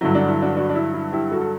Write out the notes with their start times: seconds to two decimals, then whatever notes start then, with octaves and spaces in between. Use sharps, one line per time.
0.01 G2 D3 F#3 E4
0.14 D4 F#4
0.28 E4
0.42 D4 F#4
0.57 D4 F#4
0.70 D4
0.75 E4
0.94 E4
1.12 E4 G4
1.31 F#4 A4
1.41 A4